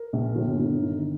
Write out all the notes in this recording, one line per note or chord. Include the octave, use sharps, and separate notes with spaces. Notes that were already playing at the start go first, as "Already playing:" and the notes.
Already playing: A#4
A#1
G1
G1
D#3